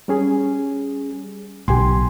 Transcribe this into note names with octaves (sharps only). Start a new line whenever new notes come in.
G3 C#4 G#4
B1 G4 G#5 C6